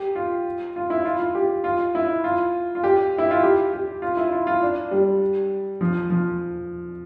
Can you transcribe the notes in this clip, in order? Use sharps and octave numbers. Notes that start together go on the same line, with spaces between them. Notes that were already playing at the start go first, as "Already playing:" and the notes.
Already playing: G4
F4
F4
E4
F4
F4
G4
F4
E4
F4
F4
G4
E4
F4
G4
G4
F4
E4
F4
F4
D4
G3
F3
F3